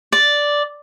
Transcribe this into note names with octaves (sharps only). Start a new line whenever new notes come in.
D5